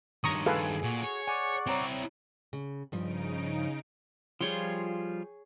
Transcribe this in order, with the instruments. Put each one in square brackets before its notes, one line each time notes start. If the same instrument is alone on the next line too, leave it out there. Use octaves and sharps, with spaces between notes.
[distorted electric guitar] G2 D#3 [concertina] C#5 C6 [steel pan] A#5 C#6 D#6
[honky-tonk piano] G#4 [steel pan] A4 B4 F5
[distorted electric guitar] A#2 [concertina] F#4
[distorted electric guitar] C#5
[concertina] D5 F#5 C#6 [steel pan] G#5
[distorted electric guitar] C4 E4 [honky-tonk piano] C#5 A#5
[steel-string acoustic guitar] C#3
[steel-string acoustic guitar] G2 F3 [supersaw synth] C#3 D#4 D7
[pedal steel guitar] F3 G3 F4 [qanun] G#4 C#5 G5